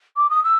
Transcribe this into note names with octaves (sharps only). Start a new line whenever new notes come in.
D6
D#6
E6